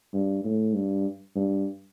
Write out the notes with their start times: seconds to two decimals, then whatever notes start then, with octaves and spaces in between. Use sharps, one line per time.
0.14 G2
0.44 A2
0.75 G2
1.36 G2